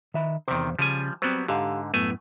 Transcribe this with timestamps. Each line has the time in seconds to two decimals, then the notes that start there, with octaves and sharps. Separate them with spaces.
0.14 D#3 E5 B5
0.48 E2 C3 D#3 C5
0.79 C#3 F3 G3 G#5
1.22 F#3 G3 B3 C4 C5
1.48 G#2 D3 G4 F5
1.94 F#2 A2 A3 B3 G#5